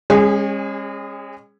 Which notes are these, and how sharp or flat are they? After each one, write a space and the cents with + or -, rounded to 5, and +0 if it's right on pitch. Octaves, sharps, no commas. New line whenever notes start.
G#3 -40 C#4 -30 G#4 +0